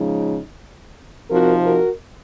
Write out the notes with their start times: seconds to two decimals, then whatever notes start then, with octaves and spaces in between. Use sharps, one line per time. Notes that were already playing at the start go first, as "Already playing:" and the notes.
Already playing: C#3 F3 G#3 D#4
1.30 C3 F3 C4 D#4 F#4 A#4
1.65 F#4 A#4